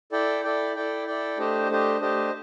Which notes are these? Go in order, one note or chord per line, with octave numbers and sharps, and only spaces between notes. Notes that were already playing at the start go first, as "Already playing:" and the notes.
E4 A4 D5 G5
E4 A4 D5 G5
E4 A4 D5 G5
E4 A4 D5 G5
A3 D4 G4 C5 D#5
A3 D4 G4 C5 D#5
A3 D4 G4 C5 D#5